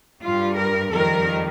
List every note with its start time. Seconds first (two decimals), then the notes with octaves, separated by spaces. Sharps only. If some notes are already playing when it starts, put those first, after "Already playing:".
0.22 G2 G3 F4
0.57 A#4
0.93 F2 D#3 G3 A#4